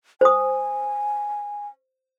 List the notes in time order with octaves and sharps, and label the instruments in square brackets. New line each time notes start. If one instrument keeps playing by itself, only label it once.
[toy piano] C5 D#6 [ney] G#5